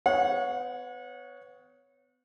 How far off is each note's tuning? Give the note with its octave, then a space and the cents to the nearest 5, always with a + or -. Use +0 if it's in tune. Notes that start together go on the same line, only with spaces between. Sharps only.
B3 +35 C#5 +5 F#5 -35